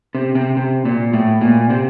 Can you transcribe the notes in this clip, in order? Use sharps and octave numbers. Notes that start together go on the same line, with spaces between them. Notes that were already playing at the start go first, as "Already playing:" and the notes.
C3
C3
C3
A#2
A2
A#2
C3